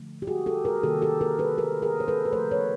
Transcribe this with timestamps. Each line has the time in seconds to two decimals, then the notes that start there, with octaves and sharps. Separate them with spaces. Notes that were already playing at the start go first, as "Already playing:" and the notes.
Already playing: D3 F3 A3
0.22 G4
0.27 F#4 G#4
0.46 G4 A4
0.65 G#4 A#4
0.83 C3 D#3 G3 A#3 G4 A4
1.02 G4 A4
1.21 G#4 A#4
1.39 A4 B4
1.58 G#4 A#4
1.82 G#4 A#4
2.00 C5
2.08 A4 B4
2.25 B4
2.32 C#3 F3 A3 A#4 C5
2.51 B4 C#5